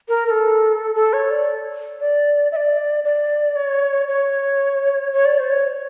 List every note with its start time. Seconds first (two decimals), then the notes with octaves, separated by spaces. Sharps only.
0.08 A#4
0.27 A#4
0.31 A4
0.95 A4
1.13 C#5
1.31 D5
2.00 D5
2.52 E5
2.56 D5
3.04 D5
3.56 C#5
4.08 C#5
5.13 C#5
5.25 D5
5.39 C5
5.51 C#5